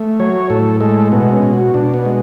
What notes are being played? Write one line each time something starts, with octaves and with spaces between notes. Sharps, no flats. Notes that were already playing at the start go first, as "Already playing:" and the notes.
Already playing: A3
F#3 C#5
A2 A4
G#3 A4
B2 B3
C#4
B2
F#4
B2 D4
B3
G#3